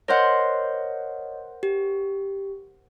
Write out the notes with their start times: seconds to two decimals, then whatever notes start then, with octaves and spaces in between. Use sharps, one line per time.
0.08 A#4 C5 C#5 D#5 F#5
1.63 G4